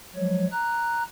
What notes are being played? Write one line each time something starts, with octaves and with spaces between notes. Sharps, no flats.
F3 F#3 G#3 C#5
A#5 F#6